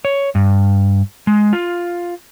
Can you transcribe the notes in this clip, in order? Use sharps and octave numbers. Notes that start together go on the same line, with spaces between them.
C#5
G2
G#3
F4